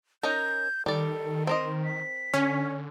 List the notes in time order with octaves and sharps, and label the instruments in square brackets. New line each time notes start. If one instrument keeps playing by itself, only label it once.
[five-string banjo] C#4 D#4 A#4 [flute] G6
[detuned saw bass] D#3 [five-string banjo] G3 D5 [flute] A4
[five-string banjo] C4 A#4 D#5 [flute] C6
[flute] B6
[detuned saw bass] D3 [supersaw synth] C#4